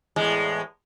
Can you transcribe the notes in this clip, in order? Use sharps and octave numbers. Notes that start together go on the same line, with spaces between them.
E2 A2 G#3